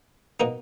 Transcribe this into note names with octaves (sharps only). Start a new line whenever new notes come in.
B2 A#3 D#4